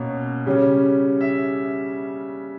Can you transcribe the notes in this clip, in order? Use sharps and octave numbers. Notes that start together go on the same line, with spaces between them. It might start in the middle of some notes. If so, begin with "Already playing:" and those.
Already playing: B2 A#3 C#4
C#3 G3 C#4
E5